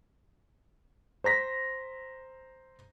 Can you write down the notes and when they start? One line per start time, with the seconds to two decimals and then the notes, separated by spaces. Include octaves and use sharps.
1.24 C5 A#5 A#6 B6